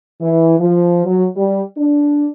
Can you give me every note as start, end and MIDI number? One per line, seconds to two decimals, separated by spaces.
0.22 0.54 52
0.59 1.03 53
1.06 1.26 54
1.37 1.62 55
1.77 2.28 62